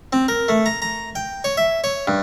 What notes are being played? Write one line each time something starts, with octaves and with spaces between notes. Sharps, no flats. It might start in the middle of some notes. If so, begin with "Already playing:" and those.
C4
A#4
A3
A#5
A#5
G5
C#5
E5
C#5
G2